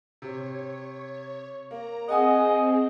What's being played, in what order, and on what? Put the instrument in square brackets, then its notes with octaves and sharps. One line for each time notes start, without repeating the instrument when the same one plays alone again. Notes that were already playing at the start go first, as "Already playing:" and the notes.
[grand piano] C3 [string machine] C#5
[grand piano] A#3 [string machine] A#5
[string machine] C4 [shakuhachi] G#4 [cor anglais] D#5 [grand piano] F#5 G#5 D#6